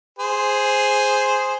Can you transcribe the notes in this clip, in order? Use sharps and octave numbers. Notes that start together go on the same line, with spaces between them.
G#4 C5